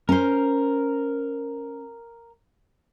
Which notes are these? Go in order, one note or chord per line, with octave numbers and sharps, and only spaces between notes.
C#4 A#4 C5